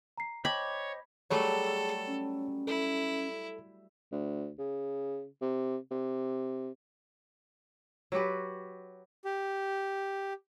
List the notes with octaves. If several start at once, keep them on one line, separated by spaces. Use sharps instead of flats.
A#5 C7
C5 C#5 D#5 G5 A5 B5 D6
F#3 G3 A3 G#4 A4 C#5
C#4
E4 A4
D2
C#3
C3
C3
F#3 F#4 G4 B4
G4